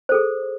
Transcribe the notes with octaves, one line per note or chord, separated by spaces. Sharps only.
G#4 A4 C5